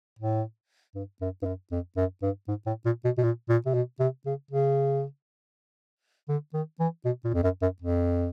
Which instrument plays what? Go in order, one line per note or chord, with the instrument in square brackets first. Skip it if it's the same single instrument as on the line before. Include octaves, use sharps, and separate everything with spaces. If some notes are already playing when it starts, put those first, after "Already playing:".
[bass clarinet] A2
G2
F#2
G2
F#2
F2
F#2
G2
G#2
A2
A#2
B2
B2
A#2
A#2
C3
B2
C3
C#3
C#3
D3
D#3
E3
B2
A#2
F2
F#2
F#2
F2